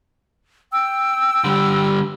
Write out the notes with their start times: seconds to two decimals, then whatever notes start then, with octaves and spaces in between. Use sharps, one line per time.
0.72 G5 E6
1.44 D3 G3